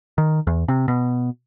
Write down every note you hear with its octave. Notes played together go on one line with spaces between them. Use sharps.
D#3
E2
C3
B2